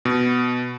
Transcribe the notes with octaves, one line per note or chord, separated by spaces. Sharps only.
B2